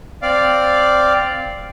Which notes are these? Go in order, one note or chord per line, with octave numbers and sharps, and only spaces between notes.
C4 D5 F5